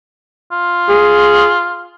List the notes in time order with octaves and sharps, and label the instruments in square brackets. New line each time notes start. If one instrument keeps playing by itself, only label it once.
[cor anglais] F4
[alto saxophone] G#4